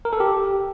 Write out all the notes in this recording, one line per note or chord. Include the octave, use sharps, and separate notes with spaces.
A#4
A4
G4